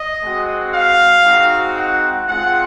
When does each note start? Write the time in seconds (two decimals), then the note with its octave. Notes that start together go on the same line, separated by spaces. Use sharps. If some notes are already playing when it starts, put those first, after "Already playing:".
Already playing: D#5
0.22 G#3 C4 F#4
0.73 F5
1.25 G#3 C4 D#4 F#4
1.76 F#5
2.27 G#3 C4 F4 F#5